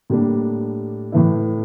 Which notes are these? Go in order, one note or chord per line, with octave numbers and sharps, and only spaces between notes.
A2 G3 A#3 D4
A2 E3 A3 E4